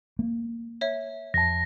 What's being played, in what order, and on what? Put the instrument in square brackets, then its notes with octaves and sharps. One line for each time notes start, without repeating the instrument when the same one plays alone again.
[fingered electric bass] A#3
[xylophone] C#5 E5
[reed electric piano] F2 A5 [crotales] A#6